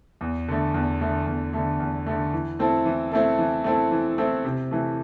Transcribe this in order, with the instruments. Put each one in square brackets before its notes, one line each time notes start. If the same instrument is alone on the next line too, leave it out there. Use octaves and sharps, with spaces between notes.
[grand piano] E2
D3 A3
E2
D3 A3
E2
D3 A3
E2
D3 A3
E3
A3 C4 E4 A4
E3
A3 C4 E4 A4
E3
A3 C4 E4 A4
E3
A3 C4 E4 A4
C3
E3 A3